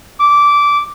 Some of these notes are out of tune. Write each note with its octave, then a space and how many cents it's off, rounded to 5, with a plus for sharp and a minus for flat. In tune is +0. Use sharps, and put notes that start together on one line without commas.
D6 -15